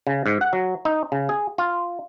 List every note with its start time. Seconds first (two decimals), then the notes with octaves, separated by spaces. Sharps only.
0.07 C#3
0.26 G#2
0.41 F#5
0.53 F#3
0.85 D#4
1.12 C#3
1.29 G#4
1.58 F4